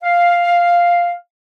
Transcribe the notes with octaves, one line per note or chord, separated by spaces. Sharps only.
F5